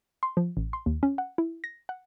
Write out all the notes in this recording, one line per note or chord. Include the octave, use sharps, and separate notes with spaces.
C6
F3
A1
C6
D#2
C#4
F#5
E4
A#6
F#5